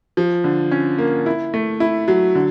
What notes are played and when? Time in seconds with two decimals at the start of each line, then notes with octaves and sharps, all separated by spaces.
0.17 F3
0.44 D3
0.71 C#4
0.98 A#3
1.26 E4
1.54 A3
1.80 E4
2.08 F#3
2.35 D3